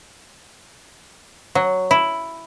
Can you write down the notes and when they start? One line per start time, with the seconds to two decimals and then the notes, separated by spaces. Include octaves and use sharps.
1.55 F#3
1.91 E4